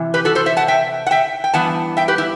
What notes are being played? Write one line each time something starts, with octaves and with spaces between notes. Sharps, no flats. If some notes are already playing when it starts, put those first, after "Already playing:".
Already playing: C3 E3
G4 B4
F#4 A4
A4 C5
C5 E5
F#5 A5
E5 G5
F#5
E5 G5
G5
G2 E3 B3 F#5 A5
E5 G5
G4 B4
E4 G4